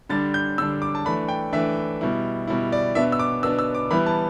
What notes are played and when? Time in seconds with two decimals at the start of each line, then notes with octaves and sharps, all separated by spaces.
0.09 D3 G3 D4 A6
0.34 G6
0.58 D3 G3 D4 E6
0.82 D6
0.95 A5
1.05 E3 A3 D4 B5
1.28 G5
1.53 E3 A3 D4 E5
2.01 B2 G3 E4
2.47 B2 G3 E4
2.72 D5
2.95 B2 B3 D4 E5
3.12 E6
3.19 D6
3.43 B2 B3 D4 E6
3.59 E6
3.75 D6
3.91 E3 G3 B3 E4 B5
4.06 A5